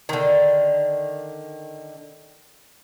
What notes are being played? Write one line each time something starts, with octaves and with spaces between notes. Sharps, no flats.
D3 D#3